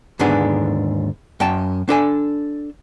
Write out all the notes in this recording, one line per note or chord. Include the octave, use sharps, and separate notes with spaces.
D#2 G#2 D3 B3 D4 G#4
F#2 G5 A5
D4 A4 G#5